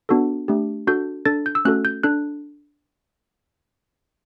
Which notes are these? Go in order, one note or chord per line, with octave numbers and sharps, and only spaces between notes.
B3 D4 F#4 A4
A3 D4 G4
D4 F#4 A4 G6
D4 A4 A6
G6
E6
A3 C#4 F#4 A4 F#6
G6
D4 A4 F#6